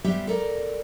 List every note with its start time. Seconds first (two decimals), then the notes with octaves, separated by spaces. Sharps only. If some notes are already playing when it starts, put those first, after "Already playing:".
0.04 G3 B3 G4 C5 E5
0.27 A4 A#4 D5